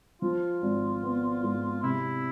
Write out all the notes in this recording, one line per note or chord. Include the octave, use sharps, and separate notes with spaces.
F3 F4
G#1
B3
G#2
C3 E4